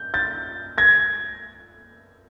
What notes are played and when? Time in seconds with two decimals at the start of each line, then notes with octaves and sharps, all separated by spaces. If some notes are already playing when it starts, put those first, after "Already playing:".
Already playing: G6
0.14 G6 A6
0.78 G#6 A#6